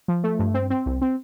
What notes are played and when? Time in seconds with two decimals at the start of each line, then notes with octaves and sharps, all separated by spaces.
0.08 F3
0.24 A3
0.39 G2
0.54 C4
0.70 C4
0.86 C2
1.02 C4